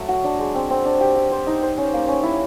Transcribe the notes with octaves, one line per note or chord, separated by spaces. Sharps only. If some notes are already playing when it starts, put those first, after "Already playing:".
Already playing: F#3 A3
F#4
D4
G#3
C4
C4
D4
G4
G4
C5
D#4
C5
C#4
A#3
C#4
E4